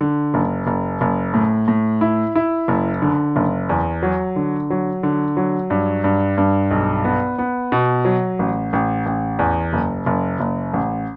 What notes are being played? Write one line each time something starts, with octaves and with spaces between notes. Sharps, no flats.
D3
F#1
F#1
F#1
A2
A2
E4
E4
F#1
D3
F#1
E2
F#3
D3
F#3
D3
F#3
G2
G2
G2
B1
B3
B3
B2
F#3
A1
A1
A1
E2
F#1
F#1
F#1
A1